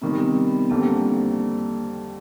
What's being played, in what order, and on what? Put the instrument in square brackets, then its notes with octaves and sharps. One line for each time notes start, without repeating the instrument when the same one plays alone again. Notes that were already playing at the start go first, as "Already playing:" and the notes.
[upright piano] C3 D#3 G3 [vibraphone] B3
[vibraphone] C4
B3
B3
[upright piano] F2 D3 G3 C4 [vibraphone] A#3